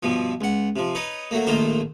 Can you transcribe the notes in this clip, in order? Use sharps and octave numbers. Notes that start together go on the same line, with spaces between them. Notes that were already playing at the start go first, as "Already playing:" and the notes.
G2 B2 F3
C#2 F#5
C3 F3
D#4 B4 C#5
F#3 A3 A#3
A#1 A2 D#3 A#3 F4 C5